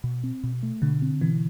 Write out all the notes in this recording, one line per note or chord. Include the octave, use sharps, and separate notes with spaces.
B2
C4
B2
A3
B2 D3
C4
B2 E3